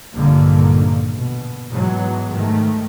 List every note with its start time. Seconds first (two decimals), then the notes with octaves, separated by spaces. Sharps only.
0.14 A#1 G2 A#2 D3 D#3 A#3
1.12 B2
1.69 G#2 B2 E3 F#3 G#3
2.32 G#2 D#3 A3